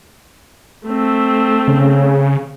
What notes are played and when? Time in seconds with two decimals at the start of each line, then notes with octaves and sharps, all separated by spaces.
0.86 A3 C4
1.68 C#3